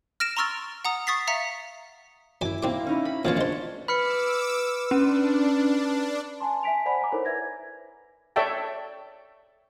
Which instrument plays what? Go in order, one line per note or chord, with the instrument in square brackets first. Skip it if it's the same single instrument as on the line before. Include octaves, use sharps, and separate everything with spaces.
[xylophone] F6 A#6 D7 E7
A#5 C6 C#6 E6 F6 A6
F#5 A#5 D#6
C#6 D#6 A6 B6 C7
E5 F5 A#5 B6 C#7
[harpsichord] F#2 G#5 [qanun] E4 D6
[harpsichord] B1 C4 D6 [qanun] A#3
[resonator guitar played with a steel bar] C#4 D#4 E4
[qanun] B5
[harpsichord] B2 F3 F4 [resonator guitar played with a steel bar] A#3 C#4 [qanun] D4 C#5 D5
[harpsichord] G#3 C5
[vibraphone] B4 [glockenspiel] B5 F6 C#7 [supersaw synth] D6 E6
[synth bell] C#4 [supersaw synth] D4
[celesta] G#5 A5 C6
E5 G#5 B6 D7 F7
C5 D5 F#5 G#5 B5 B6
G#5 A#5 D6
D#4 E4 A4 A#4 C5 C#5
B4 E5 G#6 A#6
[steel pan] A4 C#5 D5 E5 G5 A5